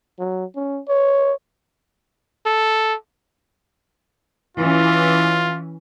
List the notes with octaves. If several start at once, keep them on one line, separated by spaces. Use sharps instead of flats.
F#3
C#4
C#5
A4
E3 C#4 F4